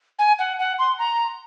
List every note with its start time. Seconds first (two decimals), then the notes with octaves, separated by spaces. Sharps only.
0.19 G#5
0.39 F#5
0.59 F#5
0.79 C6
0.99 A#5